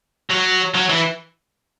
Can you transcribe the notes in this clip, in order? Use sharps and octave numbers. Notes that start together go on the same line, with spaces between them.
F#3
F#3
E3